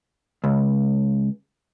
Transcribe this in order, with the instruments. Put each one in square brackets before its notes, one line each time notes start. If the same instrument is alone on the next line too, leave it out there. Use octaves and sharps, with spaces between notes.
[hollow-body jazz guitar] C#2